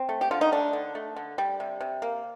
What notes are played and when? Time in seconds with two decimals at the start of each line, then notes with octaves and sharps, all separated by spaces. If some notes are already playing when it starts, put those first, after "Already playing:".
Already playing: C4
0.09 A3
0.21 G4
0.31 D3 F4
0.41 D#4
0.52 A3 D4
0.73 D3
0.95 A3
1.16 D3
1.38 G3
1.60 C3
1.81 C3
2.02 A#3